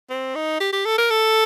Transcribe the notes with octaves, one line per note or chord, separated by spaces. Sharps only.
C4
D#4
G4
G4
A4
A#4
A4